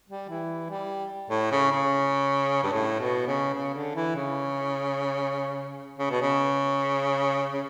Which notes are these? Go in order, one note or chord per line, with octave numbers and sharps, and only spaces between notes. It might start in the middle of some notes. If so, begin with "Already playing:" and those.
G3
E3
G3
A2
C#3
C#3
G2
A2
B2
C#3
C#3
D3
E3
C#3
C#3
B2
C#3
C#3